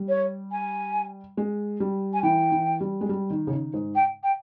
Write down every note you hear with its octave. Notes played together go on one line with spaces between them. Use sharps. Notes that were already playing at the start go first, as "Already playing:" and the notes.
Already playing: G3
C#5
G#5
G#3
G3
G#5
E3 G5
E3
G3
G#3
G3
D#3
C#3
D#3
G#2
G5
G5